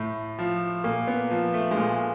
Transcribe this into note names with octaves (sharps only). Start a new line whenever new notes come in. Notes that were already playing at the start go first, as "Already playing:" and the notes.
Already playing: A2
F3
A#2 A#3
B3
F3
A3
G#3
A#2 A3